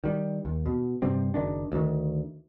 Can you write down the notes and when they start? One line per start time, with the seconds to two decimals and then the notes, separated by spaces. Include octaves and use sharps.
0.04 D#3 G3
0.45 D#2
0.66 B2
1.02 G2 C3 G3 C4
1.34 F#1 D#3 D4
1.72 D2 D#3